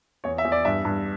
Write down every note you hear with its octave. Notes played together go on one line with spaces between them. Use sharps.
E2 C#5
E5
E2
D5
G2 E5
G2